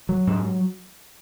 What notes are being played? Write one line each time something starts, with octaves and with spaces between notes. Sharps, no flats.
F#3
G#2